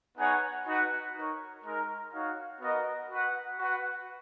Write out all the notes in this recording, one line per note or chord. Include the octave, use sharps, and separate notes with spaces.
B3 D#4 G#4 C#5 F#5
D#4 F#4 B4 F#5
D#4 A#4 C#5
G#3 D#4 A#4
D#4 F#4 C#5 F5
B3 F#4 A#4 D#5
F#4 B4 F#5
F#4 B4 F#5